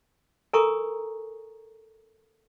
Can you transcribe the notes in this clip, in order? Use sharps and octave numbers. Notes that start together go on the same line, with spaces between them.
A4 A#4 G#5 A#5 C#6 D#6